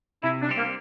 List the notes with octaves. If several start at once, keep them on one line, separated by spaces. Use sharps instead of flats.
C3 E4
D4
G3 C4 G4
A#3